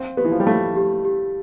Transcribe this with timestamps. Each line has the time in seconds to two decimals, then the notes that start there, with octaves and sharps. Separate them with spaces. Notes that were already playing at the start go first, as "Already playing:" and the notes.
Already playing: C4 F5
0.17 B3 G4
0.25 E3
0.32 F3
0.40 G3
0.47 A3 F5
0.76 G4
1.05 G4